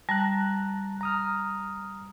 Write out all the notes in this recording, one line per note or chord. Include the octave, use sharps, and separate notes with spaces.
G3 A5 A#5 F#6
A#5 D#6 F6